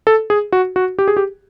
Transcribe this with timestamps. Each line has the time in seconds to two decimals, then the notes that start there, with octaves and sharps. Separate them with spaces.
0.07 A4
0.30 G#4
0.52 F#4
0.76 F#4
0.99 G4
1.08 G#4
1.17 G4